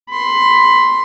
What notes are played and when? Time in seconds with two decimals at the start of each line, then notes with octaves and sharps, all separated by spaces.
0.10 B5 C6